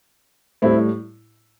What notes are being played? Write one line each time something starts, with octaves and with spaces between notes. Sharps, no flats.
A2 G3 C4 E4